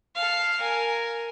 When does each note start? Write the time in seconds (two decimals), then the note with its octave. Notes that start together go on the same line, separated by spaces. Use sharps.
0.16 A4 F5
0.60 A#4 G#5